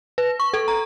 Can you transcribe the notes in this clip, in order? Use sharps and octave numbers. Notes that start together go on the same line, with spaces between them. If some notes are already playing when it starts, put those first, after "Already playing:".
B4
C#6
A4
A#5